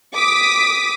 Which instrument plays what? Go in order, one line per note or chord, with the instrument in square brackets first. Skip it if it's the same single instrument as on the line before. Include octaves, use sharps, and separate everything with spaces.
[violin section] D6 D#6 B6